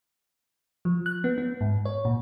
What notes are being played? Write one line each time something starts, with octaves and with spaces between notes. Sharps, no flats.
F3
F#6
B3
B3
G#2
C#5
A#2